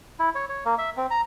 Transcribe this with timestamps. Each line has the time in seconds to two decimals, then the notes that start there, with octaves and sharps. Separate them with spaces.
0.20 E4
0.35 C#5
0.49 C#5
0.65 A#3
0.78 E5
0.97 C4
1.11 A#5